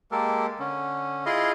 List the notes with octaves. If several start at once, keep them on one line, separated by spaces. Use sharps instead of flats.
G#3 A#3 G4 A4 A#4
D3 C#4
E4 F4 G#4 D#5 F5 C6